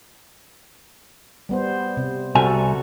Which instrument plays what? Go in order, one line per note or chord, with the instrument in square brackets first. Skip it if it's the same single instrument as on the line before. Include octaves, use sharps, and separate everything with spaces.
[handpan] G3 B3 C5
C3
[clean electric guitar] C2 G#5 [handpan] C4 F#4 A4